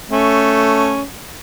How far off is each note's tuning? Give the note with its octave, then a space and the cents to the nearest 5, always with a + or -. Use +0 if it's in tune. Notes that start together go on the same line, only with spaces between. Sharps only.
A3 +0 C#4 +0